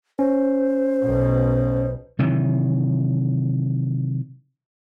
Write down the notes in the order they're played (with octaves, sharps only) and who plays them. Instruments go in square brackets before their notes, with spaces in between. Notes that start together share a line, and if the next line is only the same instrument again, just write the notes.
[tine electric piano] C#4 [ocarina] C5
[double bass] B1 B2
[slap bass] C3 D#3 E3 F#3